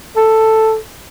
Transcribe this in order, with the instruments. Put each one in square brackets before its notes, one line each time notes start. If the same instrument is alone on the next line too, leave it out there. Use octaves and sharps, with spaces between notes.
[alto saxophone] A4